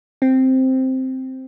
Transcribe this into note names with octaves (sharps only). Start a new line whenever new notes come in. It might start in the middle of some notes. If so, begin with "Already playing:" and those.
C4